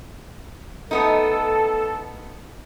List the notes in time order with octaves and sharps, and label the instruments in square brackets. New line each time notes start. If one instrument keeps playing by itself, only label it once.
[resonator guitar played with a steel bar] A3 B3 D#4 [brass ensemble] A4